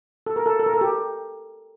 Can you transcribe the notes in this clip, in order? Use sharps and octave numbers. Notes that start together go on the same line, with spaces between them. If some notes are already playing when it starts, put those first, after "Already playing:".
A4
A#4
A4
A4
A#4
A4
G4